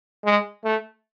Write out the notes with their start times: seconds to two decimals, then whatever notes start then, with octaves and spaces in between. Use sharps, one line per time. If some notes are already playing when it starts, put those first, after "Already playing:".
0.25 G#3
0.65 A3